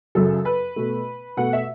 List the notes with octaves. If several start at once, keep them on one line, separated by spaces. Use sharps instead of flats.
F#2 C#3 F#3 A4
B4
B2 A3
B2 A3 F#5
E5